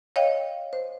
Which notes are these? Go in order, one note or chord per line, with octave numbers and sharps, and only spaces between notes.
C#5 D#5 F5 G5
C5